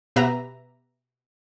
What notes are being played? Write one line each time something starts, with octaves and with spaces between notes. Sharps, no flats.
B2 B3 G4 B4 E5 A#5